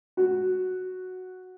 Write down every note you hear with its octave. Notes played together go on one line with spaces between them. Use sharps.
F#4